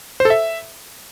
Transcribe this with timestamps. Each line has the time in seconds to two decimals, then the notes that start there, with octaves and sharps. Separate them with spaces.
0.20 C5
0.25 A4
0.30 E5